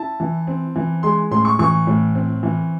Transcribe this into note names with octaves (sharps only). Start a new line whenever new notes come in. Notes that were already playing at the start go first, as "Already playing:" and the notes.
Already playing: E4 A5
E3
C4
E3
G#3 C6
A2 C6
C#6
E3 C#6
A2
C4
E3